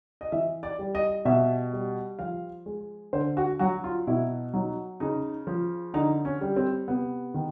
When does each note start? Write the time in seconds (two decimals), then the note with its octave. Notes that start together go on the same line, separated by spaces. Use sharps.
0.21 D#5
0.32 E3 E5
0.63 D5
0.79 G3
0.95 D#5
1.25 B2 E5
1.73 G3
2.19 F3 F5
2.66 G#3
3.13 D3 C5
3.37 F#4
3.59 F#3 F#4
3.84 F4
4.07 B2 E4
4.54 F#3 D#4
5.00 C#3 D#4
5.47 F3
5.94 D3 D#4
6.25 C#4
6.41 G3
6.56 C4
6.88 C3 B3
7.34 D#3